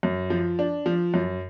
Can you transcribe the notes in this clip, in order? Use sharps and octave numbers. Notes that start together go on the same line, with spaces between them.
F#2
F3
D4
F3
F#2